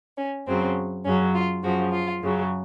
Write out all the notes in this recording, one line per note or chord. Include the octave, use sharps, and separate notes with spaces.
C#4
F#2 C#3 F#3 C4
F#2 C#3 F#3 C#4
F4
F#2 C#3 F3 F#4
F4
F#2 C#3 F#3